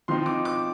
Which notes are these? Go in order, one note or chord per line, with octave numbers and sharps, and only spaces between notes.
F3 C4 D#4 C6
D6
D6